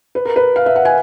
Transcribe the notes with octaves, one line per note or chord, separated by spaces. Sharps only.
B4
A#4
B4
F5
E5
F#5
G#5